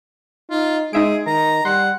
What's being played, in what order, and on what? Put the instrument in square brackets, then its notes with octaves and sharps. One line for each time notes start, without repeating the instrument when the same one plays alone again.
[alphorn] D#4 [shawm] F4
[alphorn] G#3 [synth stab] D#4 E5 D7 [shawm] G#4
[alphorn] D#3 [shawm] A#5
[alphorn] G3 [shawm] F#5 [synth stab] C6